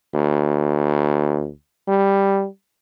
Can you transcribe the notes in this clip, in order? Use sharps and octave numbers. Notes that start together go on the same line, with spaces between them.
D2
G3